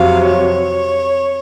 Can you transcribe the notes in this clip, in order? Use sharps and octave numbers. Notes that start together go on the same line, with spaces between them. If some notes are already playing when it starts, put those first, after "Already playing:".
Already playing: F2 C3 F#3 F5
C#5